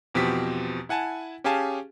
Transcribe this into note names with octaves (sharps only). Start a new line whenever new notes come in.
E2 B2 F3 C4 G4 B6
E4 F#5 G#5 A5
C#4 G4 G#4 F5 G#5 A5